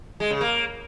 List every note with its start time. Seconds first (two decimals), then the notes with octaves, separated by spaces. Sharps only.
0.20 G#3
0.30 C#3
0.41 A#3